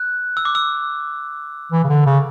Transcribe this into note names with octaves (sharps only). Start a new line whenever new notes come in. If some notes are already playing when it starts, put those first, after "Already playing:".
Already playing: F#6
E6
D6
E6
E3
C#3
D3
C#3